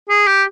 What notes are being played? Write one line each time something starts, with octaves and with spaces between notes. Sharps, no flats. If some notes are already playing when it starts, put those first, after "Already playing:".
G#4
G4